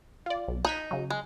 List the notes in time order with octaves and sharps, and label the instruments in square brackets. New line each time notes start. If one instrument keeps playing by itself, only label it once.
[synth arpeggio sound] F4 D5
B1
[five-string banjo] D#4 [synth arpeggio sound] F#6 G#6 B6
[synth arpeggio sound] C#3 F#3
[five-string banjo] G#3